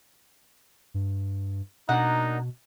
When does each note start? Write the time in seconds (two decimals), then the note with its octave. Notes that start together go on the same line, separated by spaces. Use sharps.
0.94 G2
1.89 B2 A#3 D4 D#4 F#5